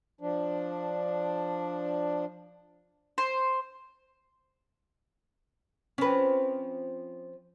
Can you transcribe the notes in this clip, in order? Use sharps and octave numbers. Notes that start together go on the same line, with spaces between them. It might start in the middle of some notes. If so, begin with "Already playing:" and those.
F3 D4
C5
F3 C4 C#4 B4